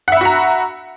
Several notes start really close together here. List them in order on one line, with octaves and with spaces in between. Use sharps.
F#5 E5 B5 F#4 A#5